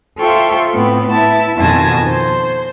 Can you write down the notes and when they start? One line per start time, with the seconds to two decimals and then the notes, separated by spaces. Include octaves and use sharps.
0.19 F4 A4 C5 E5 G5 C#6
0.73 A2 B3 C4
1.12 E4 E5 A5
1.57 F2 B2 D#3 G#5 A5 A#6
2.08 C5